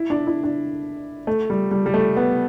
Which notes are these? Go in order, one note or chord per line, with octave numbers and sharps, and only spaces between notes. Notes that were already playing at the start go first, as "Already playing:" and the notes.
Already playing: E4
D4
E4
D4
A3
G3
G3
G3
A3
B3